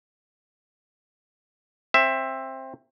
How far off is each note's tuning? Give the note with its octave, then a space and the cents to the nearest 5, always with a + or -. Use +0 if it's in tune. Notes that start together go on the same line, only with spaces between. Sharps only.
C4 +15 E5 +5